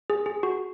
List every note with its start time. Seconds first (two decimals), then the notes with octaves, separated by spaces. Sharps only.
0.10 G#4
0.26 G#4
0.43 F#4